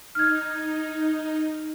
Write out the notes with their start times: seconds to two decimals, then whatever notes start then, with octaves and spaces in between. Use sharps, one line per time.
0.15 D#4 F6 G#6